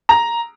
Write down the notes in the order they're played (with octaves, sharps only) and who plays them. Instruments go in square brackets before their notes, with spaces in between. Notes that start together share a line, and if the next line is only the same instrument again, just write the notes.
[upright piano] A#5